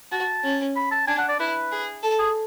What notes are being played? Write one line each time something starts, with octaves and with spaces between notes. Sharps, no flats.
F#4 A5
C#4
B5
A5
D4 G#5
F#5
D5
E4 B4
G#4
A4
G#4